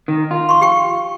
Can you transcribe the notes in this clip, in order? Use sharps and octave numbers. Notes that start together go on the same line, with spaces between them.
D#3
F4
C6 C#6
G4 G5 C#6